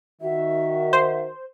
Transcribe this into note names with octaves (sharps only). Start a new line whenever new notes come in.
D#3 F#4 E5
C5